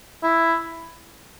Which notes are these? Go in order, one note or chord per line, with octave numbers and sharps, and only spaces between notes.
E4